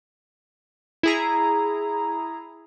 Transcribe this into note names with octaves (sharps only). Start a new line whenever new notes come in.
E4 G#4 A#5